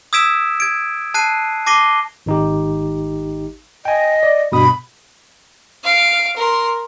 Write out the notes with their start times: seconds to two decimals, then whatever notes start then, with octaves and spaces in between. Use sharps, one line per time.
0.13 D#6 E6 G#6 B6 D7 E7
0.60 G#6 D7
1.14 A5 F#6 C7 D#7
1.66 A5 D6 A#6 C7 D#7 G7
2.26 G#1 D#4 G4
3.85 D#5 G5 G#5
4.23 D5
4.52 G2 B2 B5 D#6
5.84 F5 D7
6.37 A#4 C6